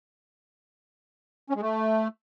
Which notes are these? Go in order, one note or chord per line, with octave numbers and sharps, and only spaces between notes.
C#4
G#3
A3